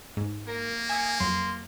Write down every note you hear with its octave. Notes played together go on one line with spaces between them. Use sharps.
G#2
A#3 A#4
E5 G#5 D#6 C#7
F2 F#3 C6